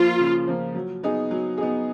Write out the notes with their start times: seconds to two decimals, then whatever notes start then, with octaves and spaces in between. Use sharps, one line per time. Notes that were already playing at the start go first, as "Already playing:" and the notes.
Already playing: F3 A#3 F4
0.19 C#3
0.48 F3 A#3
0.75 F#3
1.03 B3 D#4 G#4
1.31 F#3
1.58 B3 D#4 G#4